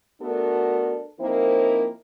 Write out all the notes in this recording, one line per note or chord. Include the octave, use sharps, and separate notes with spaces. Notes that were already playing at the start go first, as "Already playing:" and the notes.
A3 B3 D4 F#4 A4 A#4
F3 A#3 C4 D#4 E4 A#4